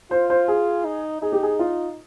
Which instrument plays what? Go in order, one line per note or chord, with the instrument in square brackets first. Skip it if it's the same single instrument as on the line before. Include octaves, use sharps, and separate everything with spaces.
[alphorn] F4 [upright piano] C5
[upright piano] C5
G#4
[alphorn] D#4
[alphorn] D#4 [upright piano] G#4
[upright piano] G4
G#4
F4